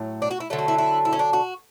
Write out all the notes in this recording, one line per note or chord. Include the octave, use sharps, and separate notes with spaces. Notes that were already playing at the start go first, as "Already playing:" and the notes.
Already playing: A2 F#3
D4
F#4
E4
D3 F#3 A3
F#4
E4
E4
E4
C#4
D4
F#4